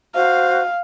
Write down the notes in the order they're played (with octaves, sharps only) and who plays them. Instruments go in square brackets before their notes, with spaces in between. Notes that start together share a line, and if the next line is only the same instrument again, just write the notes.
[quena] F#4 [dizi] C5 [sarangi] F5